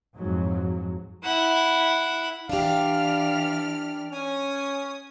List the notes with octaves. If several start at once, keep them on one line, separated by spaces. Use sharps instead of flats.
F2 G#2 F#3
E4 F#5
E3 D4 G4 D5 F5 F6
C#4 G#5 D#6